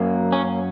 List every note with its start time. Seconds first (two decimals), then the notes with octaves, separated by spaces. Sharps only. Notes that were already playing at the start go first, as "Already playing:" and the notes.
Already playing: F#2 F#3 A#3
0.32 C#4